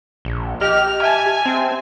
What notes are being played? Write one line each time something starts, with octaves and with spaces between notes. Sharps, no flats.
A#1
G4 D#5 F6
E5 G#5 A5
C4